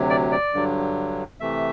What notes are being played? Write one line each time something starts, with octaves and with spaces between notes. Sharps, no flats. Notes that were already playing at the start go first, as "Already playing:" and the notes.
Already playing: D2 C3 F#3
D5
D5
G2 D3 F#3
C3 E3 A3 E5